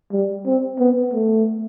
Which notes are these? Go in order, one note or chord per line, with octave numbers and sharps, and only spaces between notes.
G3
C4
B3
A3